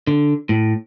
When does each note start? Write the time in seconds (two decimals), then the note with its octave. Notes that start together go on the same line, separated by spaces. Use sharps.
0.07 D3
0.49 A2